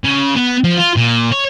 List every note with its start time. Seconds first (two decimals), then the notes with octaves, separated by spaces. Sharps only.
0.04 C#3
0.36 B3
0.64 F3
0.78 F4
0.97 A#2
1.32 C#5